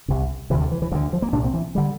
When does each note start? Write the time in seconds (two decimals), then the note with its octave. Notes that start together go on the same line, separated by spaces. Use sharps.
0.08 C2 C3
0.50 C3 E3
0.54 D2
0.60 D3
0.71 E3
0.82 E3
0.91 D2 F3
0.95 D3
1.13 F3
1.22 A#3
1.33 C2 A#2 D4
1.44 C4
1.54 E3
1.75 D3 G3